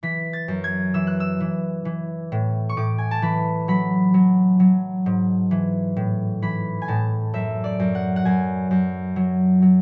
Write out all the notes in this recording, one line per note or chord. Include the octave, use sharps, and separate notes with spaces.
E3 B6
A6
F#2
G#6
E3 E6
F#6
E6
E3
E3
A2
C#6
A2 D6
G#5
A5
E3 B5
F#3 B5
F#3
F#3
G#2
E3
A2
E3 B5
G#5
A2 A5
F#2 E5
D5
F#2
F#5
F#5
F#2 G#5
F#2
F#3
F#3